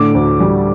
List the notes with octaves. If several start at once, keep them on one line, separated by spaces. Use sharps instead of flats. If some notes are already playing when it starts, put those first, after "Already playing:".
Already playing: A2 D3 D6
D2
G3